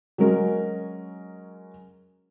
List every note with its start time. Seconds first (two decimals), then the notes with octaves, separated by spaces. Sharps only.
0.18 F#3 G#3 C#4 A#4